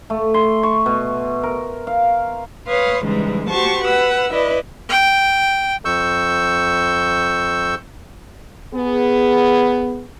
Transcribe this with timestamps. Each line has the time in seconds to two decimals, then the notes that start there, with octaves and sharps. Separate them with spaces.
0.10 A3
0.34 C6
0.63 C#6
0.86 B2
1.43 A#4
1.87 F5
2.67 B4 C#5 F5 C6 D#6
3.04 G#2 C#3 E3 G3 G#3
3.50 F#4 G4 C5 A5 C#6
3.85 B4 F#5 E6
4.30 E4 B4 D5 D#5
4.89 G5
5.85 F2 C#6 E6 G6
8.74 B3 G#4